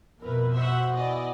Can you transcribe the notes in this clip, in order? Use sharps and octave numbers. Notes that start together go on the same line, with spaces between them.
F2 B2 E4 A#4 B4
F#4 C5 E5 F#5
E3 B3 E4 D5 D#5